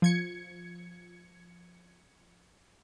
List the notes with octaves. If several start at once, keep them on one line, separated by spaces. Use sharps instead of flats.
F3 G#6 C#7